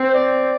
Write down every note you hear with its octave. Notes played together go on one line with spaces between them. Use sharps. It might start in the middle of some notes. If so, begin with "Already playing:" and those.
Already playing: C4
C5
D5